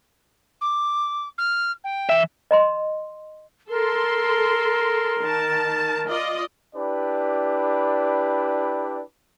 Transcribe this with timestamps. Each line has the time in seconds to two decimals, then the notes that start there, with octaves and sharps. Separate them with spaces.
0.61 D6
1.38 F6
1.84 G5
2.09 E3 E5
2.51 D#5 A#5 C6
3.70 A4 A#4 C6
5.21 D#3 A5
6.08 F4 D5 D#5
6.75 D4 E4 G4 B4 D5